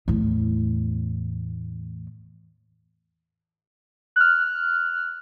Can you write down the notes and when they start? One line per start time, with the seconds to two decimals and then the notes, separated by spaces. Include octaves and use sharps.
0.08 E2 A2
4.16 F6 F#6